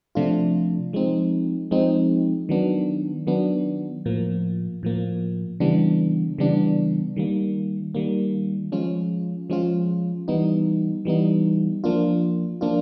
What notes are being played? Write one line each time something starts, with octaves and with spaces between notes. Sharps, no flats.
C3 F3 A3 D4 F4
F3 G#3 C4 D#4
F3 G#3 C4 D#4
D#3 F#3 B3 D4
D#3 F#3 B3 D4
A2 F3 A#3
A2 F3 A#3
C#3 E3 G3 B3 D4
C#3 E3 G3 B3 D4
D#3 G3 A#3
D#3 G3 A#3
F3 G#3 C#4 F4
F3 G#3 C#4 F4
E3 G3 B3 D#4
E3 G3 B3 D#4
F3 A#3 D4 F4
F3 A#3 D4 F4